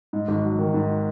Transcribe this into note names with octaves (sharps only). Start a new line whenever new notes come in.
G#2
G#1
F#3
D#3
G#2